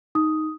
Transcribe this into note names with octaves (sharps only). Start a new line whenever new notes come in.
D#4 D#6